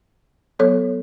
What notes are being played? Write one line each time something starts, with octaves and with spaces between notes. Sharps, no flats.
F#3 B3 A4 C#5